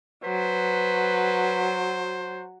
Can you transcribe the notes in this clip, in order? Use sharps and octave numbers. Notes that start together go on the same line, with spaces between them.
F#3 B4 C5